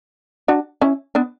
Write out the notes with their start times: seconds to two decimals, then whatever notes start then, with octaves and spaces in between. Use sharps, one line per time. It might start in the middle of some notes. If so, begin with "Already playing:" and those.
0.48 D4 F#4
0.81 C#4 E4
1.15 B3 D4